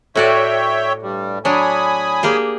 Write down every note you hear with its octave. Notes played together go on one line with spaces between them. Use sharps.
A2 F#4 C#5 D5 E5 G5
G2 G3
F#3 D4 G#5 B5 D#6
A#3 G4 G#4